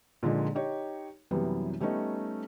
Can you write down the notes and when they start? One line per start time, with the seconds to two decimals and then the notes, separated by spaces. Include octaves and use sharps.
0.23 A#2 D3 F3 G#3 D#4
0.55 D#4 G4 C#5
1.31 F#2 C3 E3 G3 B3
1.80 G3 A3 B3 C#4 D#4